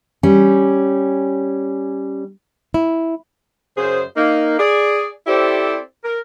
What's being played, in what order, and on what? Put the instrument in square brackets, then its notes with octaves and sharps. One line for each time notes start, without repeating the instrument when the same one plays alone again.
[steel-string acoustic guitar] G3 C#4
[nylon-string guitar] E4
[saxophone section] F#2 C#3 G#4 C5
A#3 D#4
G#4 D5
C4 E4 G4 A4 C5 D5
A#4